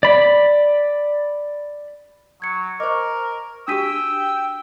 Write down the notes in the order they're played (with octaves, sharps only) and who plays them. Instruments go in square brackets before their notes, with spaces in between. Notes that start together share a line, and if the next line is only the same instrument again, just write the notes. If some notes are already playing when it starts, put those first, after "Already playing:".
[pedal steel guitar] D5 B5
[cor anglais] F#3 [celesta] G#6 C#7
[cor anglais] A#4 [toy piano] C5 D#5 [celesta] C#6 D6
[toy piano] D4 F#4 G4 [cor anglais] G5 [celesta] D#6 B6 D#7 [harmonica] E6